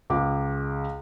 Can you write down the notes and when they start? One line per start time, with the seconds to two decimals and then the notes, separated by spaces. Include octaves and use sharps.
0.10 C#2 D6